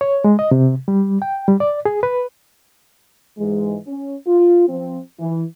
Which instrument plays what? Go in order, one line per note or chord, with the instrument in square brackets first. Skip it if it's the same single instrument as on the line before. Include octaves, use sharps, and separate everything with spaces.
[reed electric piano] C#5
G#3
D#5
C3
G3
G5
G3
D5
G#4
B4
[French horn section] G#2 E3 G#3
C#4
F4
F3 C4
E3